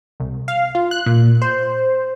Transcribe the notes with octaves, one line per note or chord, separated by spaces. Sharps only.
C2
F5
F4
F#6
A#2
C5